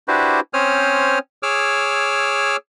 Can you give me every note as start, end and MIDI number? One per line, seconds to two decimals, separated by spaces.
0.08 0.40 62
0.08 0.40 64
0.08 0.40 66
0.08 0.40 67
0.08 0.40 71
0.08 0.40 72
0.54 1.19 60
0.54 1.19 61
0.54 1.19 72
0.54 1.19 73
0.54 1.19 87
0.54 1.19 89
1.43 2.56 68
1.43 2.56 73
1.43 2.56 86
1.43 2.56 88
1.43 2.56 89